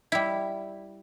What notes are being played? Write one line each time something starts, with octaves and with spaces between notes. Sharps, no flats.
G3 E4